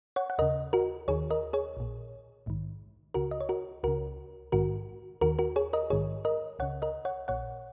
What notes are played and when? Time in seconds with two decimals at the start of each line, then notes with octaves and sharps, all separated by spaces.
0.16 C#5 F#5
0.30 F#5
0.38 D#2 C#3 A#4 D#5
0.73 F#4 A#4
1.08 D#2 D#3 G#4 C#5
1.31 A#4 D#5
1.53 G#4 C#5
1.77 A#1 A#2
2.46 A#1 G#2 D#3
3.14 C#2 C#3 F#4 A#4
3.31 D#5
3.41 C#5
3.49 F#4 A#4
3.83 C#2 C#3 F#4 A#4
4.52 A#1 G#2 D#3 F#4 A#4
5.21 D#2 D#3 F#4 A#4
5.39 F#4 A#4
5.56 G#4 C#5
5.73 A#4 D#5
5.90 A#1 G#2 D#3 G#4 C#5
6.25 A#4 D#5
6.59 C#2 C#3 C#5 F#5
6.82 A#4 D#5
7.05 C#5 F#5
7.28 A#1 A#2 C#5 F#5